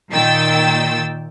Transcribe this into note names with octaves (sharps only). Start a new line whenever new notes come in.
A#2 D#3 G5 E6 A6